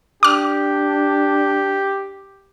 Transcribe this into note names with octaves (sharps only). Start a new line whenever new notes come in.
D4 G4 D6 F6